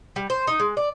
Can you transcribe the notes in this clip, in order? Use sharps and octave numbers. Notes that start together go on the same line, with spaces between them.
G3
C5
D#4
G#3
D5